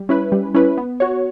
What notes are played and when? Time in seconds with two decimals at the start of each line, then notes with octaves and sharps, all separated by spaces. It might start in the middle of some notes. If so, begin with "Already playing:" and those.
Already playing: G3
0.09 C#4 E4 B4
0.32 G3
0.55 C#4 E4 B4
0.78 B3
1.00 F#4 C#5